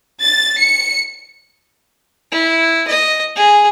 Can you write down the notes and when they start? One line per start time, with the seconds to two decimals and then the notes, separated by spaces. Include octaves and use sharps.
0.21 A6
0.60 C#7
2.32 E4
2.88 D#5
3.36 G#4